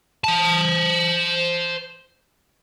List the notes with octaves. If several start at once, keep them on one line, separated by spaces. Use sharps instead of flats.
C5 A5